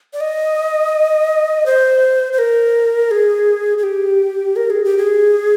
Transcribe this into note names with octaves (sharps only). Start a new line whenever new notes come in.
D5
D#5
C5
C5
A#4
G#4
G#4
G4
A#4
G#4
G4
G#4